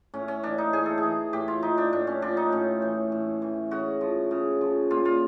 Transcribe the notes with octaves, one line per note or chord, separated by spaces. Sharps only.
A2 C#4
C#4
E3 D4
D#4
A2 G#4
A4
G#4
E3
A2 G4
F4
F3 D#4
D4
A2 D4
C#4
F3 D4
D#4
A2 C#4
E3
A2
E3
C#3 F#4
F3
C#3
F3
A#2 F4
F4